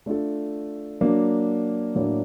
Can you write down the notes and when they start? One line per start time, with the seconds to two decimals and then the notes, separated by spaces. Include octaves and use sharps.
0.06 A3 D4 F4 A4
1.01 F#3 A#3 D4
1.95 A2 F#3 A#3 D4